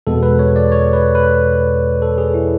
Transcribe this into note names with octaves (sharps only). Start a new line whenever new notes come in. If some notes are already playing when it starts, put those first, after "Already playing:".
E2 B2 G#3 B3 A4
B4
C#5
D5
C#5
B4
B4
A4
G#4
E4